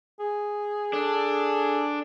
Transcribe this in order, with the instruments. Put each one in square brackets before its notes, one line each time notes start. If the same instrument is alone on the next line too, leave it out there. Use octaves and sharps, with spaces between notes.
[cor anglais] G#4
[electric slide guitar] D4 [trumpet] A4